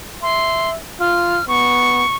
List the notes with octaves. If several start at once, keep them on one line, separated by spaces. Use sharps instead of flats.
E5 C6
F4 F6
B3 C#6